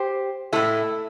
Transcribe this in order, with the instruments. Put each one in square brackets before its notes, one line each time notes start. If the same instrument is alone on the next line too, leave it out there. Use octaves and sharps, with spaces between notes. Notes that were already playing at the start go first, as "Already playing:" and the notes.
Already playing: [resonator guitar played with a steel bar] G4 C5
A2 A3 E4 A4